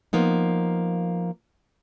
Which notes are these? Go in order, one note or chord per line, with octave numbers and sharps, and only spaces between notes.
F3 A#3 B3 D#4